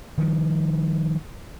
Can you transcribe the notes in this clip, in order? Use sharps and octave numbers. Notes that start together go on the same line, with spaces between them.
D#3 F3 G3